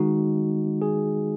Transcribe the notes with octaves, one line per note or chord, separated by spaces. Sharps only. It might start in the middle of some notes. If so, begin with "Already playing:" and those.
Already playing: D#3 G#3 D#4 F#4
G#4